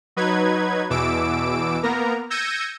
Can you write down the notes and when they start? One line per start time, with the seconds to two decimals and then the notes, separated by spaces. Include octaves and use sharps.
0.16 F#3 D#4 B4 G#6
0.90 E2 B2 E3 D6 E6 D7
1.83 A#3 B3 A#4 A#5
2.30 E6 G6 G#6 A#6 C#7 D#7